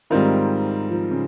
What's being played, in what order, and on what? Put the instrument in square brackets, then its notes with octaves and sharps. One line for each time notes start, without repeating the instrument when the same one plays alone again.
[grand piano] G#2 G3 C4 F4 A#4 [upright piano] D#3
[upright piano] F3
C#3